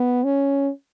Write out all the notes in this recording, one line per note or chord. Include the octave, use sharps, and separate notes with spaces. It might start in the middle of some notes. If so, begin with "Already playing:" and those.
Already playing: B3
C#4